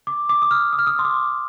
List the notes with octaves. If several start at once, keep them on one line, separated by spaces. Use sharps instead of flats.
D6
D6
D#6
F6
D#6
F6
D#6
C6
D6